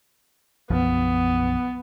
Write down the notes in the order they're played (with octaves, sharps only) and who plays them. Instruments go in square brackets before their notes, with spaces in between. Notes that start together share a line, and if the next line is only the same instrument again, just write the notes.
[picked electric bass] B1 F#2 F3 [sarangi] B3